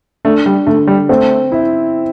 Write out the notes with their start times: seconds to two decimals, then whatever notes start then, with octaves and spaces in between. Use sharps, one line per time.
0.25 A3 D4
0.46 G3
0.67 D3 A3
0.87 G3
1.09 A3 C4
1.52 E4